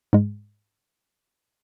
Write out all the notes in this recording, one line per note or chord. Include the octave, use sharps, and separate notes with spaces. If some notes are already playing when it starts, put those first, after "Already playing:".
G#2 G#3